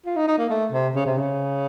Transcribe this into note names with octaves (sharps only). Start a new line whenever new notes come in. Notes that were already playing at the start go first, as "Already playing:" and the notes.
F4
D#4
D#4
A#3
A3
C3
C#3
C3
C#3